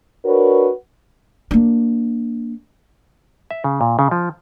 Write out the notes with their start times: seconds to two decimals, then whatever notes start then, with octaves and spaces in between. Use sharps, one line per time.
0.25 D4 F#4 A#4 B4 C#5
1.51 A#3 D4
3.51 E5
3.64 C#3
3.81 A#2
3.99 C#3
4.11 F3